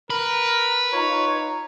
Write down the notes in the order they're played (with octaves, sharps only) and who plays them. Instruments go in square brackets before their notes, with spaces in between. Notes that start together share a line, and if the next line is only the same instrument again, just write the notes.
[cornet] A#4 [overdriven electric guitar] B4
[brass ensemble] D#4 F4 A#5 [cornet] C#5